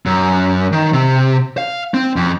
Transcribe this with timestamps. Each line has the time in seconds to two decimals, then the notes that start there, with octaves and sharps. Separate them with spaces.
0.06 F#2
0.73 D#3
0.93 C3
1.58 F5
1.94 C4
2.16 F2